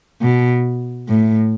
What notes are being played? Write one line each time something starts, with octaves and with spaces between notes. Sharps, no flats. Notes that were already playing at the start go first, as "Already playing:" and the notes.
B2
A2